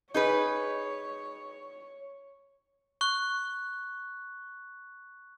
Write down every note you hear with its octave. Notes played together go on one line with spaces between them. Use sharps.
D#4 G#4 B4 C#5
C#6 F#6